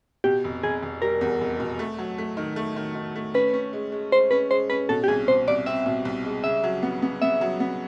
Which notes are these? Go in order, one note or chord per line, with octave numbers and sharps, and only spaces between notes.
B2 G4
F1
F1 G#4
F1
G3 A#4
E2
F1
B2
A3
F#3
A3
D#3
A3
D#3
D#3
A3
C#4 B4
C#4
G#3
G#3
G#3 C5
C#4 B4
G#3 C5
C#4 B4
B2 A4
G4
C2 G#4
B2 C5
C2 D5
C4 E5
B2
C2
G#3
C#3 E5
F#3
B3
B3
B3 E5
F#3
B3